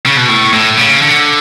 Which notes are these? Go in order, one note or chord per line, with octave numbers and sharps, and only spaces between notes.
C#3
B2
A2
A2
C#3
D3